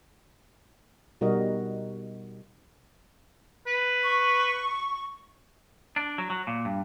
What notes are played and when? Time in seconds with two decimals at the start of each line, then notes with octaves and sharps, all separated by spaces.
1.21 B2 G3 D#4 F#4 A#4 D#5
3.67 B4
4.03 C#6
5.96 D4
6.18 F#3
6.30 F#3
6.47 A#2
6.65 G2